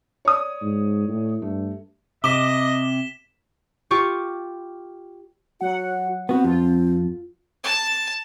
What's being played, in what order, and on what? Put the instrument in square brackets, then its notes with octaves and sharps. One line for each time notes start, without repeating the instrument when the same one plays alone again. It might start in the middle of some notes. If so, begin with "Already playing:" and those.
[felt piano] C#5 D5 D#6
[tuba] G#2
A2
[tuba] G2 [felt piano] A3
[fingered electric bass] C3 [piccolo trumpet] D#5 [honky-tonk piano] D6 [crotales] B6 E7 G7
[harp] F4 G4 C#6 D6
[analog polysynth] F#3 F#5 [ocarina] F#4
[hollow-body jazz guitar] B3 F#4 [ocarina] C4
[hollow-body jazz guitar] F2 [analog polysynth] F4
[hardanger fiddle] A5